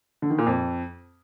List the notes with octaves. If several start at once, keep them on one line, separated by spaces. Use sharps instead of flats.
D3
D#3
A#2
F2